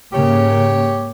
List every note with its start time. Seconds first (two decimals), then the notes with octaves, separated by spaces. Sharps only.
0.13 G#2 C#3 A#3 G4 C#5